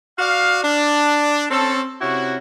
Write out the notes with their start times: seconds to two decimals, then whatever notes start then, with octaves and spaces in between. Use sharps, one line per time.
0.19 F#4 D5 F5
0.64 D4
1.51 C4 C#4 A4
2.01 C3 C#4 E4 F#4